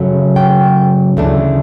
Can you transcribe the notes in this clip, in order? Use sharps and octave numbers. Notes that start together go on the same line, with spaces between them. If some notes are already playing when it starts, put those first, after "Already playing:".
Already playing: F#2 C#3 F#3 A3
G5
D2 C#3 E3 A3 D4